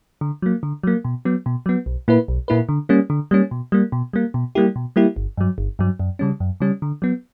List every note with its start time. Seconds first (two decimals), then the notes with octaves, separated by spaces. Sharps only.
0.21 D3
0.42 F#3 A#3
0.63 D3
0.83 F#3 A#3
1.05 B2
1.25 F#3 B3
1.46 B2
1.66 F#3 B3
1.86 B1
2.08 A#2 A#3 E4 B4
2.28 B1
2.48 A#2 A#3 E4 B4
2.69 D3
2.89 G3 A#3 C#4
3.10 D3
3.31 G3 A#3 C#4
3.51 B2
3.72 G3 A#3
3.92 B2
4.13 G3 A#3
4.34 B2
4.55 G3 A#3 E4 G4
4.76 B2
4.96 G3 A#3 E4 G4
5.16 G1
5.37 G2 F#3
5.58 G1
5.79 G2 F#3
6.00 F#2
6.19 C#3 G3 C#4
6.40 F#2
6.60 C#3 G3 C#4
6.82 D3
7.02 F#3 B3